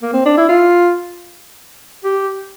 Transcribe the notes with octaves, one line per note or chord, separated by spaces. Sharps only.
A#3
C4
D4
E4
F4
G4